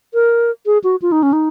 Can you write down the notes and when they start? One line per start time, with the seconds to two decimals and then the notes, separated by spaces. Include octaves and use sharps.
0.14 A#4
0.66 G#4
0.84 F#4
1.02 F4
1.12 D#4
1.23 C#4
1.33 D#4